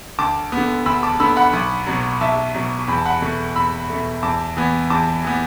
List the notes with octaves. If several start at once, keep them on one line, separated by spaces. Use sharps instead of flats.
D2 A5 D6
B3
D3
D2 B5 E6
A5 D6
D3 B3 B5 E6
F#5 B5
B1
B2 F#3
B1 E5 A5
B2 F#3
E2 B5
A5
F#5 B5
B2 A3
E2 B5 E6
B2 A3
E2 A5 D6
E3 B3
E2 A5 D6
E3 B3